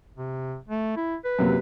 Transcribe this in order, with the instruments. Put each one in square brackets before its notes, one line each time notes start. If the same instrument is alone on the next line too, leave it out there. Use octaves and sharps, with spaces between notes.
[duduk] C3
A3
E4
B4
[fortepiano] F#2 C3 A#3